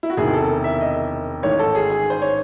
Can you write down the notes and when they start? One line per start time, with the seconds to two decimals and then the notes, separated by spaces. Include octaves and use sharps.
0.03 E4
0.10 F#4
0.17 E1 E2 C3 D#3 G#4
0.34 A4
0.64 E5
0.80 D#5
1.43 A1 G#2 D#3 C#5
1.59 A4
1.75 G#4
1.90 G#4
2.10 C5
2.22 C#5